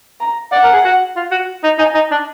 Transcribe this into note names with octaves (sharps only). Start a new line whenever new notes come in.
A#5
D5 F#5
A#4
G#4
F#4
F4
F#4
D#4
D#4 G#5
D#4
D4